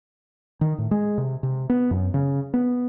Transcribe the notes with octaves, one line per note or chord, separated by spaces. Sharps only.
D#3
A2
G#3
C3
C3
B3
F#2
C#3
B3